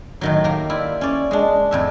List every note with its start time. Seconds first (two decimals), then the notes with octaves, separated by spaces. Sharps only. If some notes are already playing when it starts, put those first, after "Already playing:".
0.21 A2 D#3 F#3
0.44 A#3 G4
0.70 E4 F4 D5
1.01 C#4 D5
1.31 G#3 D4
1.71 F2 A2 E5